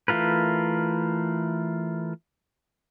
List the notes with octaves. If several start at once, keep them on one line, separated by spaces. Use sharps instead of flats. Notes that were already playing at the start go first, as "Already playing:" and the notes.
E3 A3 F4 A#4 B4